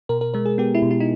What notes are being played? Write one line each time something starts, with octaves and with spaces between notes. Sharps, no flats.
B2 A#4
A#4
G#3 A#4
G#4
B3 G4
E4
B2
E4
D#4